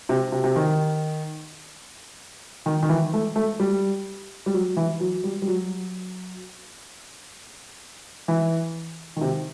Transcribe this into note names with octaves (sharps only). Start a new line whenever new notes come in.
C3
C3
C3
D#3
D#3
D#3
E3
A3
A3
G3
G3
F#3
E3
F#3
G3
G3
F#3
E3
D#3
C3